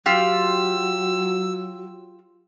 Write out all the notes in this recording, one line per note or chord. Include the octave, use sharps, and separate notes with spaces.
F#3 F4 G4 E6